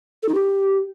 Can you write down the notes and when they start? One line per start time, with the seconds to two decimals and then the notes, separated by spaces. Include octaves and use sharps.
0.23 A4
0.29 D#4
0.35 G4